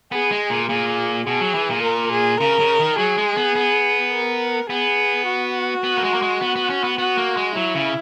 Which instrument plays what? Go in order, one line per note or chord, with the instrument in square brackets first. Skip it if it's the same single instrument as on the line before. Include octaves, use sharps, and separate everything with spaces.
[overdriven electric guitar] B3 [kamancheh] G#4
[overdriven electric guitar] G#3
A#2
[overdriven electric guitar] A#2 [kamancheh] G#4
[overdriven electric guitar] B2 [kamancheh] G#4
[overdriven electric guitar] F#3
E3
A#2
[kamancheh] A#4
G#4
[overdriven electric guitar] C#3 [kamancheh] A#4
[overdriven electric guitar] C#3
D#3
[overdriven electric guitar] F#3 [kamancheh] G#4
[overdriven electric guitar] G#3
B3
B3
[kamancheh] A#4
[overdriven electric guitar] B3 [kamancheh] G#4
[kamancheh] F#4
[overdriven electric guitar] B3
A#3
G#3
A#3
G#3
B3
B3
C#4
B3
[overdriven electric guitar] B3 [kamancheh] F#4
[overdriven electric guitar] A#3
G#3
[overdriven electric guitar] F#3 [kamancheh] E4
[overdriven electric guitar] C#3